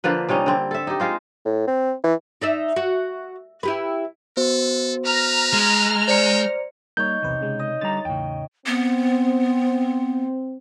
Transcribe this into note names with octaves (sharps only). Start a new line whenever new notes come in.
D3 F3 A#3 B4
C3 G3 C#4 D#4
D3 C4
A4 E5
D#4 G4
G#3 F4 C5
A2
C4
E3
D#4 D5 E5
F#4
E4 G4 B4
B3 F#4 A4 C5
B4 A#5 F6
G#3
C5 D5 G5 C#7
G3 A#3 D#4 C#5 G6
B1 E2 C3 B4
C#3 G#3
D#5
D3 G3 A#5 A6
E2 A2 C#3 G5
B3 C4